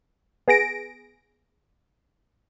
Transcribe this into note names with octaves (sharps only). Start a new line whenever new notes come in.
B3 G#4 A#6 D7